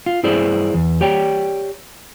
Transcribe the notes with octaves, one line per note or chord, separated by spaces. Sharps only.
F4
G2 E4 G#4 C5 D5
E2
G4 C#5 D5 G5